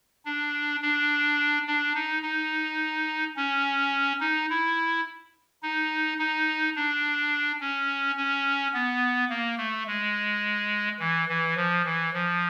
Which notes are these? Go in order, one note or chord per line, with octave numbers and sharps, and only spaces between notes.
D4
D4
D4
D#4
D#4
C#4
D#4
E4
D#4
D#4
D4
C#4
C#4
B3
A#3
A3
G#3
E3
E3
F3
E3
F3